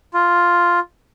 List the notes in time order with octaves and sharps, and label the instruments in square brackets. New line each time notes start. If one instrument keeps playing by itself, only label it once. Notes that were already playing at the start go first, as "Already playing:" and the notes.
[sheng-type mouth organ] F4